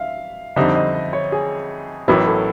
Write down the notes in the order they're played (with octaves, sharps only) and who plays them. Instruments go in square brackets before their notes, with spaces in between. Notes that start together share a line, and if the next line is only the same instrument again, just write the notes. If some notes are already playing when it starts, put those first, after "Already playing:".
Already playing: [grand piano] E5 F5
[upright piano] F2 D3 G3 C4 D#4 [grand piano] E5
[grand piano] D#5
D#5
C#5
G#4
[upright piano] A1 A2 F#3 B3 E4 [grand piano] A#4
[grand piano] A4